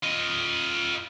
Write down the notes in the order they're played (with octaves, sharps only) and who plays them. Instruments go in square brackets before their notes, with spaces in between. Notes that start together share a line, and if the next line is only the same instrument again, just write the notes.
[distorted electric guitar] F4 D#5